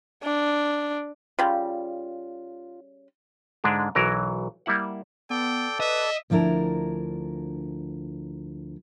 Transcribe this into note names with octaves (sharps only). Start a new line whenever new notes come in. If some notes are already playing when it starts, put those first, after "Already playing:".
D4
C#3 G3 F4
G#2 D3 G#3 D4
B1 E3 F#3 A#4
G3 A#3 E4 F#5
B3 A4 D5 G5
B4 D#5 E5
D2 F3 D4 E4 A#4 A#5